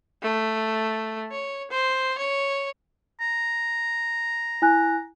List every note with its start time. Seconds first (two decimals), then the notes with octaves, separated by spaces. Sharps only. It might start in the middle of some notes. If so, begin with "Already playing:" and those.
0.22 A3
1.31 C#5
1.71 C5
2.18 C#5
3.21 A#5
4.62 E4 G#5 F#6